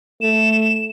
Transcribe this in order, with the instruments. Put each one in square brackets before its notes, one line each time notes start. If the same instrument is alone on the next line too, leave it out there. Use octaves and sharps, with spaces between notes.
[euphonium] A3 [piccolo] E7